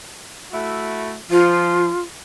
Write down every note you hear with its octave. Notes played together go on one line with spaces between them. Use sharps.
A3 E4 F#4
F3 F4